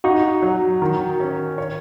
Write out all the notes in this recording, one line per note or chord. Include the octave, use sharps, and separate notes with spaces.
D#4 F#4
F#3
D#3
C#4
C#5